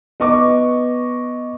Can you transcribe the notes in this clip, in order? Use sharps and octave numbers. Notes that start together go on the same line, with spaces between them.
B3 D#5 C#6 D6